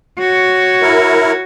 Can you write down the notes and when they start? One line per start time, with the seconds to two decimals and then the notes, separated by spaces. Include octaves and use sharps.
0.19 F#4 C#5
0.82 E4 A#4